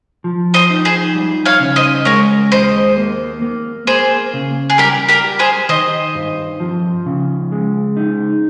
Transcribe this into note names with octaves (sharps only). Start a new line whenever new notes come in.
F3
C5 D#5
D#4
G#4 C5
G3
C#5 F5
C#3
C5 D#5
G#3 A#4 C#5
D#2 C5 D#5
A#3
A#3
A#3 G#4 C5
C#3
G#4
G3 G4 A#4
G4 A#4
G4
G#4 C5
D#3 C5 D#5
G2
F3
C#3
G#3
D#4